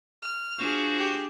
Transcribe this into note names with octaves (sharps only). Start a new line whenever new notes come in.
F6
D4 F4 F#4 G#4 C5
G4